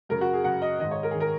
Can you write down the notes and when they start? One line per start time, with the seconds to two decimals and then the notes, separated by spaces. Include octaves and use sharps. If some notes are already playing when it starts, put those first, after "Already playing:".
0.09 F#2 C#3 A#4
0.21 F#4
0.33 G#4
0.44 F#2 C#3 F#5
0.62 D#5
0.80 G#2 D#3 D#5
0.91 C#5
1.03 A#4
1.11 D#3 G#4
1.20 A#4